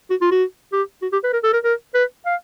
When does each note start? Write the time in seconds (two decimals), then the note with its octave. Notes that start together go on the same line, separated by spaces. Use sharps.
0.10 F#4
0.21 F4
0.31 F#4
0.73 G4
1.02 F#4
1.12 G4
1.24 B4
1.33 A#4
1.43 A4
1.53 A#4
1.64 A#4
1.94 B4
2.26 F5